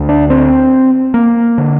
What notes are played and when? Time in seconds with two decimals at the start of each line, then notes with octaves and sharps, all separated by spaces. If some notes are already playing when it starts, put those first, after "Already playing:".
Already playing: D2 D3
0.09 D4
0.30 C4
1.14 A#3
1.58 D3